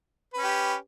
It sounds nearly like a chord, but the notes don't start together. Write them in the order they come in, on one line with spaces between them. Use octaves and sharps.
B4 C#4 G4